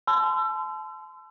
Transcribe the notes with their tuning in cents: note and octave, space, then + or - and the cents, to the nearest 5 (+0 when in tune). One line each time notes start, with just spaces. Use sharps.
A5 -35 C6 -30 E6 +30